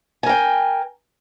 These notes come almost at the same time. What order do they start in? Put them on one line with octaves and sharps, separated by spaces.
G#5 A#4 G5